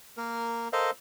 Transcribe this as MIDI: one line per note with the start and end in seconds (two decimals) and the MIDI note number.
0.17 0.68 58
0.17 0.68 70
0.73 0.91 69
0.73 0.91 70
0.73 0.91 72
0.73 0.91 75
0.73 0.91 77